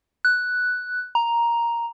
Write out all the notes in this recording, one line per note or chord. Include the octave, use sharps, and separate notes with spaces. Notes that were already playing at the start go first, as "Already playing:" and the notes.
F#6
A#5